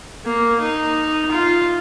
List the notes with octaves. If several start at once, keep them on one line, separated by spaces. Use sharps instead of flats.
A#3
D#4
F4